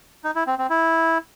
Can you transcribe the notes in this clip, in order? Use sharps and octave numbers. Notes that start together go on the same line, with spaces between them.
D#4
E4
C4
C4
E4